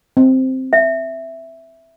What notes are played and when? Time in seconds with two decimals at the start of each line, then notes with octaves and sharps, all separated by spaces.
0.17 C4
0.73 E5